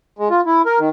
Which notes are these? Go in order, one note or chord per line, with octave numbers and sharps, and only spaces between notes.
G#3
F4
E4
A#4
D#3